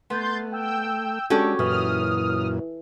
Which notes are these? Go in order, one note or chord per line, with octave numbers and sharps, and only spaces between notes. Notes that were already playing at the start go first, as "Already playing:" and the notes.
A3 B3 C6 G6 A6
G5 E6 G6
G#3 C#4 D4 F#4 G4 A4
F#2 A#2 E3 D#6 F6